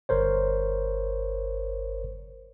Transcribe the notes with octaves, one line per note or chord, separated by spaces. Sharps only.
G1 A#4 C5 C#5